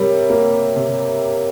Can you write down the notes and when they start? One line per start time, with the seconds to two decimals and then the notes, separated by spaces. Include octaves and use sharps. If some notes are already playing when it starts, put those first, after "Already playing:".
Already playing: C3 G3 A#4 C#5
0.30 A#3
0.76 C3